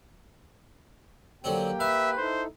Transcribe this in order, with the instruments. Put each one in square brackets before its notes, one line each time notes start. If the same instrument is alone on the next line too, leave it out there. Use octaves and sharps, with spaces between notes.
[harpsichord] D3 F#3 C4 [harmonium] A#3 G4 G5
[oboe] B4 [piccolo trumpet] E5 [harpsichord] F5
[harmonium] D#4 E4 A4 [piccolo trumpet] C5